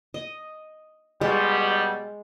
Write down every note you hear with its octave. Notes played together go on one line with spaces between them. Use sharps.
D#5
B2 G3 G#3